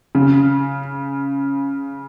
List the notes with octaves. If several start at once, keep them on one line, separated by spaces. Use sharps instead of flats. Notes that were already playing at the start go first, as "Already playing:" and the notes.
C#3